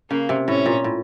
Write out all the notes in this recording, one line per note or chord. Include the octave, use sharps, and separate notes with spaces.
C#3 A#3
C3
A2 C#4
A#2
A2